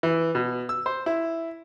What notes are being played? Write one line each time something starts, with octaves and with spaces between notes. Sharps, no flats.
E3
B2
E6
C5
E4